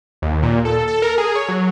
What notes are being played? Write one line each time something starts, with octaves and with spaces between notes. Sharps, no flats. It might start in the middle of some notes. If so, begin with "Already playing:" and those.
D#2
A#2
A4
A4
A#4
G#4
C#5
F#3